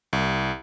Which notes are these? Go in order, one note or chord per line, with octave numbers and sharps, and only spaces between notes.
C2